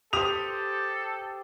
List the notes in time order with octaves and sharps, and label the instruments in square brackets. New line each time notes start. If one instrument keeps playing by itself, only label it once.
[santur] G4 C5 [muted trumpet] A4 [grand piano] D#6 F7